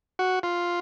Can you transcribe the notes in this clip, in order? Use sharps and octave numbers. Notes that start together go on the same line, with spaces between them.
F#4
F4